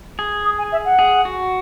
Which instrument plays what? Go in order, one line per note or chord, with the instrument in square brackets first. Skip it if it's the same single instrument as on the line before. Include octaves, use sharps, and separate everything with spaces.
[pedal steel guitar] G#4
[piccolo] D#6
G#5
E5
F#5
[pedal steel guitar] G#4
F#4